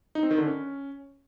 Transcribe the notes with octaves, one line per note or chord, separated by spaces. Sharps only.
D#4
C4
D#3
D3
C#4